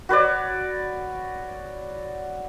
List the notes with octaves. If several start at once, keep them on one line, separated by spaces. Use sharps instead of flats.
F#4 B4 C#5 D5